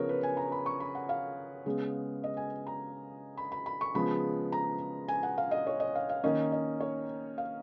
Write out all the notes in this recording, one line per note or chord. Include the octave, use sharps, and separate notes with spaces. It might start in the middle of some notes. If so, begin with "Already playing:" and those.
Already playing: C#3 F3 B3 A#4 C#5
B4
G#5
A#5
B5
C#6
B5
F#5
F5
C#3 G#3 B3
D#5
G#5
A#5
B5
B5
B5
C#6
C#3 F3 G#3 B3 B5
A#5
G#5
F#5
F5
D#5
C#5
D#5
F5
F5
D#3 A#3 C#4 D#5
D#5
C#5
F5